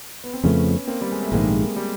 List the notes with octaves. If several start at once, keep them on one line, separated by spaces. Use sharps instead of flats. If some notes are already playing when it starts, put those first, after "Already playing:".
B3
C4
F2 C#3 F3 A3 B3 C#4
A#3 C4
G3
G#3
A3
A#1 G#2 D#3 G#3 A#3
G3